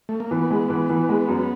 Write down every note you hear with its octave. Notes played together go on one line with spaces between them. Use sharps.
A3
A#3
E3 B3
G#3
E3
E3
G#3
F#2